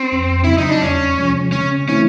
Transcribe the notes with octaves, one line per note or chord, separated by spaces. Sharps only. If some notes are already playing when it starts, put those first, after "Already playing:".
Already playing: C4
F2
C#3 F#3 E4
D#4
D4
E2 C#4
C3 F3 G#3
C#3 C#4
E3 A3 C4 C#4 E4